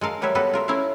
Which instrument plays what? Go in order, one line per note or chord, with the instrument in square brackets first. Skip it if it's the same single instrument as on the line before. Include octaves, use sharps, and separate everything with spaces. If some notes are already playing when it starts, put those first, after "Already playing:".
[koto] G#3 A4 A#4 F5
F#3 G3 A#4 B4 C#5 E5
G3 B3 F#4 A4 B4
F4 A#4 E5
A3 C#4 E4 A#4 E5 F5